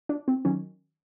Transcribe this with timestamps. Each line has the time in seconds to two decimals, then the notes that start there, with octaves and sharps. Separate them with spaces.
0.09 D4
0.28 C4
0.45 D#3 F#3 C#4